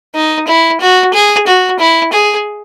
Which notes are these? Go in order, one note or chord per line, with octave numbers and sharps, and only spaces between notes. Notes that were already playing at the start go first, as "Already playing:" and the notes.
D#4
E4
F#4
G#4
F#4
E4
G#4